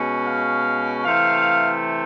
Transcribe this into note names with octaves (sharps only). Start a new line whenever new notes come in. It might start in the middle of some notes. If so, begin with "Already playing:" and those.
Already playing: B2 G#3 C#4
F5
C3 E3 A3 F5